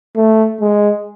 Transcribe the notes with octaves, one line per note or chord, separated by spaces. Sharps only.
A3
G#3